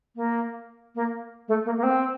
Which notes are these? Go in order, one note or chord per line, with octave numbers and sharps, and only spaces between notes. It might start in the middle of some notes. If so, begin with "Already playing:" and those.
A#3
A#3
A3
A#3
A#3
C4